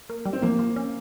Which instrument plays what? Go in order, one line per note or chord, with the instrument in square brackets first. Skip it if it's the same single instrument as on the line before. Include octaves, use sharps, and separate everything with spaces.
[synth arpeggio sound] A#3
G3
[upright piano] C4
[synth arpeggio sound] F3 [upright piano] A#3
[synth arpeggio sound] F3
C#4